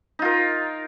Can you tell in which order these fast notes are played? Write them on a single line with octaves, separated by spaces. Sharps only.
D#4 F4 A#4